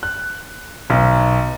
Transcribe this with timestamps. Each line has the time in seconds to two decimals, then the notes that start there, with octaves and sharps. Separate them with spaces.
0.03 F#6
0.90 B1